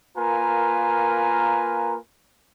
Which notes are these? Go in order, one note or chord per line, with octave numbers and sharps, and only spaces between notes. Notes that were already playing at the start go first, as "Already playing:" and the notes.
A#3 F4 A#4 B4 G#5 A#5